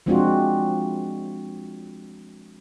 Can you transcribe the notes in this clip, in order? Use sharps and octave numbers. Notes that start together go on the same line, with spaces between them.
F3 G#3 C4 D4 F4 F#4